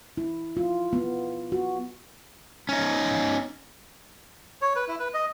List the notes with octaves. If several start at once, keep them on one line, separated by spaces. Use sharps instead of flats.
E4
F4
B3
F#4
C#4 D#4
C#5
B4
E4
B4
D#5